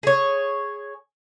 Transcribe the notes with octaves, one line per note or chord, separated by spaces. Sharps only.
G#4 C#5